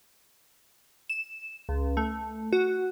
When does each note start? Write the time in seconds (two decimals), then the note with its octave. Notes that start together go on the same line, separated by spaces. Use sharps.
1.10 E7
1.69 C#2
1.97 A3
2.53 F#4